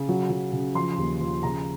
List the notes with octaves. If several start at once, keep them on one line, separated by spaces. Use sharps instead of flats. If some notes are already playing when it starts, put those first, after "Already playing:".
Already playing: C#3
F#3
F#3
C#3
F3 C6
D#2
F3
C#3 A#5